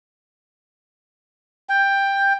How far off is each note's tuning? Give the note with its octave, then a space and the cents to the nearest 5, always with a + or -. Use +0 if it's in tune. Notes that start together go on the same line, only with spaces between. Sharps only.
G5 +10